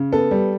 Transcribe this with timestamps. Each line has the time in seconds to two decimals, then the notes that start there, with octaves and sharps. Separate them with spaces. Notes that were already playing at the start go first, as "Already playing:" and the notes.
Already playing: C#3
0.13 B3 A4
0.31 G3